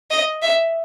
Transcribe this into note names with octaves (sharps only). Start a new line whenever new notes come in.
D#5
E5